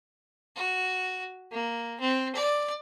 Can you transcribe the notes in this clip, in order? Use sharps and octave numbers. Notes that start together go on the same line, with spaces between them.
F#4
A#3
C4
D5